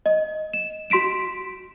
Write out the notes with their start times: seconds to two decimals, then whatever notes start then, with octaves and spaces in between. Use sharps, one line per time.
0.06 D#5
0.53 E7
0.90 F#4 C6 B6 D7 E7